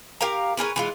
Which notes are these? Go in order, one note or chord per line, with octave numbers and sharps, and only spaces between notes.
G4 A#4 F5 A#5
C#4 G#4 A#4 B4
E3 G#3 F4